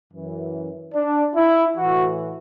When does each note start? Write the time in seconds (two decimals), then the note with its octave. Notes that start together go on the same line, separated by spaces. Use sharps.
0.12 F#2 E3
0.94 D4
1.35 E4
1.76 A2 E3 F#4